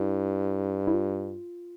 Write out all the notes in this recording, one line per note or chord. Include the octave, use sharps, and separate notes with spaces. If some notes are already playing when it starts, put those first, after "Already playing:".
Already playing: G2 E4
E4
F4